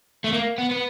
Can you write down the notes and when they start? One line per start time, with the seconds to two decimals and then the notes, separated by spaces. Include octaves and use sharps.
0.24 A3
0.33 A#3
0.58 B3
0.71 B3